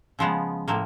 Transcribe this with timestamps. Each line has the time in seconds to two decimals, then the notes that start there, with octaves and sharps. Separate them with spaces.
0.19 C#3 F3 G#3 B3
0.68 A2 F3 A#3